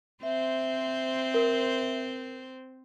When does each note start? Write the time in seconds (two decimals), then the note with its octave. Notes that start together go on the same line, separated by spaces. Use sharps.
0.23 C4 C5 E5
1.34 A#4